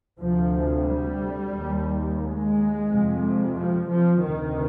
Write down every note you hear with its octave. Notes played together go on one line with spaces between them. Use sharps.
D2 C3 F3
G3
D#2
G#3
F2 C3
F3
F3
D2 C3 D#3